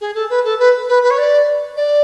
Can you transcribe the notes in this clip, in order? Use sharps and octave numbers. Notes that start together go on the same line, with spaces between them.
G#4
A4
B4
A4
B4
B4
B4
C#5
D5
D5